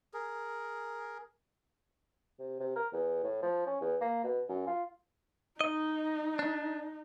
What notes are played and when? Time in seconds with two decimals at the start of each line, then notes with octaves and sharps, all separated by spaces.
0.14 G#4 A#4
2.39 C3
2.60 C3
2.76 A#4
2.93 E2
3.24 A2
3.42 F3
3.67 C#4
3.81 E2
4.01 A#3
4.24 B2
4.49 F#2
4.67 F4
5.61 D#4 D#5
6.39 D4